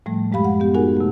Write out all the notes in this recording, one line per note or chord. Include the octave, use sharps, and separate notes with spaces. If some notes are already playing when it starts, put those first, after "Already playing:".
A2 F3 G3 A3
F#2 G#3 G4 F5 B5
F#5
B3 G4
D#4 F#4 G#4 A#4 F#5 G#5
C3 A3